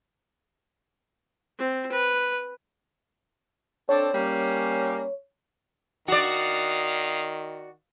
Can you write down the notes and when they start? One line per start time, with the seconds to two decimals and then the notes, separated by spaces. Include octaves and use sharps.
1.59 C4
1.92 B4
3.89 C4 D4 A4 C#5
4.14 G3 A#3 C#4
6.08 D#3 F#4 D5 F5 D#6